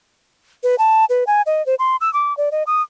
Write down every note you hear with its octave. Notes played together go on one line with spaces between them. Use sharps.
B4
A5
B4
G#5
D#5
C5
C6
E6
D6
D5
D#5
D#6